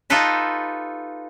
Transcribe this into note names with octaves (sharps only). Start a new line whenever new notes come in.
D#4 F4 G4 A4 B4 E5